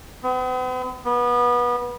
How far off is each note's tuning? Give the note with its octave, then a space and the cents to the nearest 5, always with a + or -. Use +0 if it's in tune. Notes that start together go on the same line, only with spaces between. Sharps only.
B3 +45
B3 -25